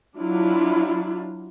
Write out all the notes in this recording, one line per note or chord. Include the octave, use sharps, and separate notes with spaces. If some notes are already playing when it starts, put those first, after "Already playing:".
F#3 D4 E4 F4